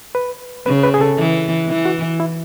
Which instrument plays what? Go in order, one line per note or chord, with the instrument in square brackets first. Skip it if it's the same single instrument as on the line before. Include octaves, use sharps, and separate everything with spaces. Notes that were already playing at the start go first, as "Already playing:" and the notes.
[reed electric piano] B4
[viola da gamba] C#3 [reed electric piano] B4
[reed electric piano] B4
G#4
A4
[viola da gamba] E3
E3
[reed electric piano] F#4
E4